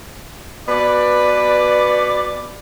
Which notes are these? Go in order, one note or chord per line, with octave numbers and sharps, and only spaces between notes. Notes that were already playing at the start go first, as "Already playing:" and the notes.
B2 B4 D5